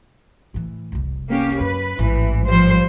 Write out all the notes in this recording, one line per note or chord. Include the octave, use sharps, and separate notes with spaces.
A2 E3
F1 C2
A#3 C#4 G4
F#2 B4
A1 G#2 E3
F3 G3 C5